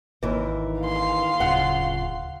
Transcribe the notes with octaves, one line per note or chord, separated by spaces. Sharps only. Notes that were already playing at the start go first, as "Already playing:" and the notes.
G#1 D#2 E3
F5 C6
D1 C#3 F4 F#5